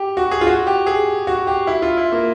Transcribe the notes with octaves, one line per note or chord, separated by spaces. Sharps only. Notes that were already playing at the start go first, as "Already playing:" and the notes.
Already playing: G4
F#4
G#4
F4
F#4
G4
G#4
F#4
G4
E4
F4
E4
A#3